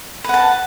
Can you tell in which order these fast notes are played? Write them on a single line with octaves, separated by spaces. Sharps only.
B4 F#5 A5